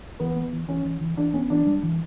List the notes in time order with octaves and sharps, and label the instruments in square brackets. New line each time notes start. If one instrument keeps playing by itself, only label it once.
[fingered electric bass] E3 [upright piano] B3
[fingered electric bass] B3
E3
[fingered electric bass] E3 [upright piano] C#4
[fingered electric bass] E3
E3
[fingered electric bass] E3 [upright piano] D4
[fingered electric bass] B3 [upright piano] C#4
[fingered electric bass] E3 [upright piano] D4
[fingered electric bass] G3
E3